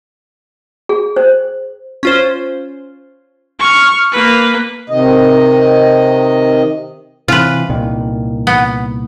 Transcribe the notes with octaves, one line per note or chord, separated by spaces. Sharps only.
G#4
C5
C#4 F4 C5
C#6 F6
A#3 B4
C3 D#3 D#5
C3 E3 F4 B4
C2 A#2 D#3
B3